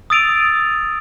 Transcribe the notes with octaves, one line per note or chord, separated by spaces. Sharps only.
D#6 E6 A6 D7 D#7 F7